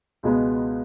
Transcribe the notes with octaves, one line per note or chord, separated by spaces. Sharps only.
C#2 B2 G#3 B3